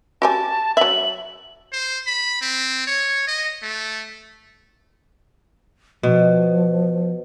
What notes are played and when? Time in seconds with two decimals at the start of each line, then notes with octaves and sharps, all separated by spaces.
0.22 F#4 G4 G#5 A5
0.77 F#3 E5 F#7
1.72 C5
2.07 B5
2.41 C4
2.87 C#5
3.27 D#5
3.63 A3
6.03 B2 F3